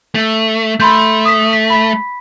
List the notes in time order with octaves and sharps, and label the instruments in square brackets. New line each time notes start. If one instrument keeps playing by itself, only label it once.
[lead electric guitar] A3
[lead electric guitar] A3 [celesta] B5 C6 G6
[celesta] D#6 B6
B6
B5 B6